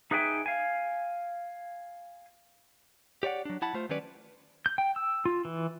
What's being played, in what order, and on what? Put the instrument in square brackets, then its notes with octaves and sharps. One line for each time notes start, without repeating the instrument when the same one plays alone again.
[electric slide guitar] D#4 G#4 B4 E5 G5 G#5
F5 G#5
[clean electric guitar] G4 C#5 D5 F#5
F#3 D4
E4 F#5 A5 B5
A3 F4 C5
D#3 F#3 G3 C#4 B4 D5
[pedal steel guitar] G6
G5
E6
F4
E3